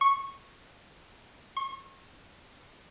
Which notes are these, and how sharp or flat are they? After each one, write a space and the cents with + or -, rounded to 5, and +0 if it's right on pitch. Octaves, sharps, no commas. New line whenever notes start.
C#6 -10
C#6 -40